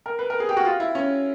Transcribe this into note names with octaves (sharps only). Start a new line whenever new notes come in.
A#4
B4
A#4
G#4
G4
F#4
F4
E4
C#4